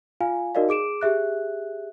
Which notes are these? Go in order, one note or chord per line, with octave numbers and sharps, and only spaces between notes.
F4 F5 G#5
D#4 F#4 A#4 D5 D#5 F5
G#4 D6 D7 E7
G4 G#4 E5 F#6